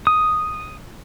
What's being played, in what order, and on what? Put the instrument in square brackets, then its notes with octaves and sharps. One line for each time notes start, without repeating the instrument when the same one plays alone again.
[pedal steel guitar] D#6